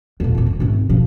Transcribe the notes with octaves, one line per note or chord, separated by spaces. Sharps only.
F2 B2
F2 A#2
F3
G#2 C3
C4
B2 F3